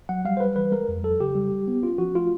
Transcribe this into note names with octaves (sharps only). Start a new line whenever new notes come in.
F#3 F#5
G3 F5
C5
G3 B4
E3 B4
G#3 A#4
F2
F#3 A4
C#3 G4
G3
G3
B3
C#4 F4
F3 F#4
A3 F4